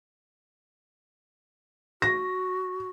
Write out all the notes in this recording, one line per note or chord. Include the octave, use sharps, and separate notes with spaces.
F#4 A#6